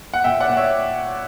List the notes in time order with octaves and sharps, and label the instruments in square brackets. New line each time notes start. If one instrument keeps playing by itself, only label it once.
[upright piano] F#5
A#2 E5 G5
D5 F#5
A#2
C#5 E5